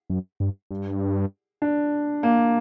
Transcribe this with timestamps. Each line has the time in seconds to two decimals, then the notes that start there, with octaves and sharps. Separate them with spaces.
0.10 F#2
0.40 G2
0.71 G2
1.62 D4
2.23 A#3